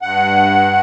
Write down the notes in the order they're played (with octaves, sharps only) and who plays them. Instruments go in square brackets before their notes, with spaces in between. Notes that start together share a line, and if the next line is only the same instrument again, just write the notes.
[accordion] G2 F#5